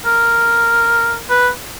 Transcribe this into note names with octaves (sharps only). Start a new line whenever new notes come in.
A#4
B4